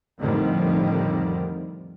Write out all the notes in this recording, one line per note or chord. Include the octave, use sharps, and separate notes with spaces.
F2 A2 D3 D#3 F3 G3